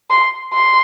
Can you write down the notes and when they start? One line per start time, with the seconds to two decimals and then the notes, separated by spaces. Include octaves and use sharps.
0.11 C6
0.53 C6